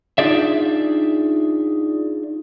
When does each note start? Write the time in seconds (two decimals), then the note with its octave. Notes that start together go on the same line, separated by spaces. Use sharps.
0.18 D4 D#4 F4 G#4 D5 E5